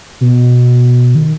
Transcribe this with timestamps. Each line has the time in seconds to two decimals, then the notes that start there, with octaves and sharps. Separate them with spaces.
0.21 B2
1.15 D#3